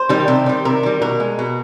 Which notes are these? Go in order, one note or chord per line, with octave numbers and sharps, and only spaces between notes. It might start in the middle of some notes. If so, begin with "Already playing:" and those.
Already playing: C5
D#3 G3
C3
D#3 G3
C3 A#4
D#3 G3
B2 A#4
G#3
B2